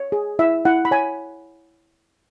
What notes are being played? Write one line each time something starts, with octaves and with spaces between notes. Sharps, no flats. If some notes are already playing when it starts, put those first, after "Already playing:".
Already playing: C#5
G#4
E4 E5
E4 F#5
B5
C#5 G#5